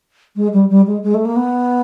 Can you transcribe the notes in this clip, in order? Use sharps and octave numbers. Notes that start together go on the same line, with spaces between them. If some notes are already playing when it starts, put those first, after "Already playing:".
G#3
G3
G3
G#3
G#3
A3
A#3
B3